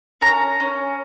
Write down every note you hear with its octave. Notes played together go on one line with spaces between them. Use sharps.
C#4 A#5
C#4